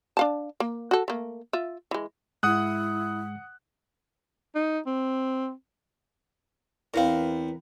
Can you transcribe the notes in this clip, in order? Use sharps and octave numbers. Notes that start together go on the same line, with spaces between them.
D4 F5 A5
A#3
F#4 A4
A3 A#3
F4 E5
E3 G#3
G#2 G#3 E4 F#5 D#6 F#6
D#4
C4
E2 C4 A#4 B4 F5